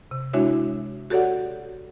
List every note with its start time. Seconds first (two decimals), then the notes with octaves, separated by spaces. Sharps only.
0.11 C3
0.33 G#3 D4 E4 F#4 C#5 E5
1.10 F#4 G4 A4 C#5 D5 F#5